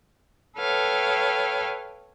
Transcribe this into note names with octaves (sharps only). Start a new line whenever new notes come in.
A4 B4 C#5 F5 G5